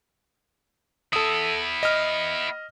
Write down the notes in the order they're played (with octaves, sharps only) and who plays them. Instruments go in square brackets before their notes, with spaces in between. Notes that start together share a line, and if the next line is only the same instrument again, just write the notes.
[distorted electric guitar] B3 E4 [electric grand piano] A4 D#6
[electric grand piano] D#5 F6